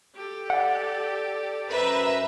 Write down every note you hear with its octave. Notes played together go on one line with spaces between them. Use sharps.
G4 A4
D5 F#5
F#2 B4 C5 E5 A#5